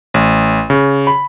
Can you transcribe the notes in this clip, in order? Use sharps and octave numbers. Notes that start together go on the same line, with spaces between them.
A1
C#3
B5